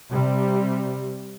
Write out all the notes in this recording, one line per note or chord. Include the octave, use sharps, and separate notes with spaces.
C3 G3